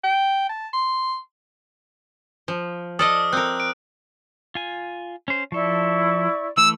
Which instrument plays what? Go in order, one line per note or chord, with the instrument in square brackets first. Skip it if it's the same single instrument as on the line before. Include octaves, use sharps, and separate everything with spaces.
[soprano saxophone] G5
A5
C6
[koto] F3
[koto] A4 D5 D#5 [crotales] D#6 F6
[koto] C4 A#4 [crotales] F#6
[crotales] D7
[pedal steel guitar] F4 G#5
C#4 C5
[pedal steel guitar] F3 A4 [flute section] E4 D5 C#6
[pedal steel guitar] E3 A3 [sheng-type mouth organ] E6